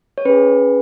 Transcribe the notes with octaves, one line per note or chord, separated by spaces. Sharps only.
C#5
C#4 G#4 B4